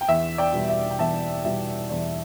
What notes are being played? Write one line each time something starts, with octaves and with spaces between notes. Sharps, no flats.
G5
E2 E5
D5 G5
B2 G3
E5
G5
E2 E5 A5
B2 G3 E5
E2 D5